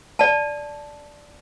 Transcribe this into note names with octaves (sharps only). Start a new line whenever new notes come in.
D5 A5